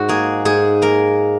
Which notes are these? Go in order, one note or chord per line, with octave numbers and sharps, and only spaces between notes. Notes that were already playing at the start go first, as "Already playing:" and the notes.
Already playing: G#2 F#4
A#3 G#4
G#2 G#4
A#3 A#4